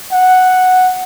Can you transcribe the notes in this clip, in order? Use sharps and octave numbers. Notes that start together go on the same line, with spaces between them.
F#5